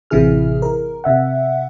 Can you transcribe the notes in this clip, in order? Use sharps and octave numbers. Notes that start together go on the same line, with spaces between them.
A1 C3 E3 E4 G#4 F6
A#4
C3 E5 F#5